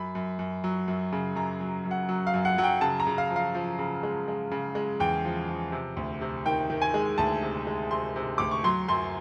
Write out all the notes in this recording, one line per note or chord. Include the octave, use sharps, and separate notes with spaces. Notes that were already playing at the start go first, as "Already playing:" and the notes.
Already playing: F#2 B5
F#2
F#2
F#3
F#2
C#3
F#2 A#5
F#3
F#2
F#5
F#3
F5
F#2
F#5
F#3 F#5
G5
C#3 A5
A#5
C#3
F5
F3
F5
F3
C#3
G#3
G#3
C#3
G#3
E2 G5
F3
F3
C3
D2
C3
D#3 G5
D#3
G#5
G#3
D2 A5
C3
G#3
C3 C6
C3
D2 D6
C#6
F#3 C6
F#2 C6